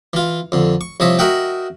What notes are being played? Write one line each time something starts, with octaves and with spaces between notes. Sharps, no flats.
E3 F4
F2 D3
C#6
C2 F3 C#5 D#5 E5
F#4 A#4 D#5 E5 F#5 G5